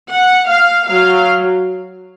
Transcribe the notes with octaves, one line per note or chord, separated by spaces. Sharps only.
F#5
F5
F#3 F5